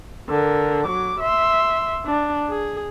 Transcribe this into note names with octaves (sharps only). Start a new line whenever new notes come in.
D3 A#4
F#3 D6
E5 C6
D4
G#4